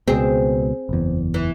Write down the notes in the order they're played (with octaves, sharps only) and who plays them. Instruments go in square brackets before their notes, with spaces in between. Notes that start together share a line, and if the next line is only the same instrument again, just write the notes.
[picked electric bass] C#2 B2 [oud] C4 G#4
[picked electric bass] F#1 E2
[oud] E3